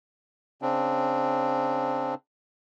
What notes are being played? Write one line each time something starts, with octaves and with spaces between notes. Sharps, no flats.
C#3 C4 D4